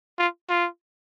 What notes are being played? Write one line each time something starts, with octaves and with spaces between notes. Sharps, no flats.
F4
F4